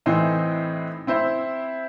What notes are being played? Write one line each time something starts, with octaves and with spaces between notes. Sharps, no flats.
A2 E3 C4 D#4
C4 E4 C5